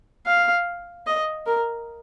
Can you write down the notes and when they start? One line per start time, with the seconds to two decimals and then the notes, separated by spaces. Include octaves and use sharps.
0.27 F5
1.07 D#5
1.47 A#4